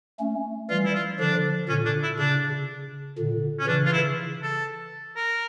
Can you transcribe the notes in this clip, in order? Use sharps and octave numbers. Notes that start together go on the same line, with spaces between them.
A3 C#4
E3 G3 F4
E4
F4
D3 F3 D4
A#2 D3 C#4
D4
E4
C#3 D4
A#2 D3
C#4
C#3 E3 D4
F4
E4
A4
A#4